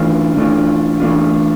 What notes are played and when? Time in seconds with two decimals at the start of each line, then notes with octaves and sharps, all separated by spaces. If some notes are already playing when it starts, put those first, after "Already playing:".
Already playing: E3 A3 D4 F4
0.36 E3 A3 D4 F4
1.00 E3 A3 D4 F4